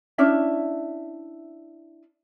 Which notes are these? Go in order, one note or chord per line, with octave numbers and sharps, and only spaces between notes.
C#4 D4 E4 E5